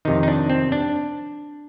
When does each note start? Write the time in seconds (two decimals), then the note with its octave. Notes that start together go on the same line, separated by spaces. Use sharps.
0.05 F2 C3 D#3 D#4
0.23 D#4
0.28 D4
0.49 C4
0.72 D4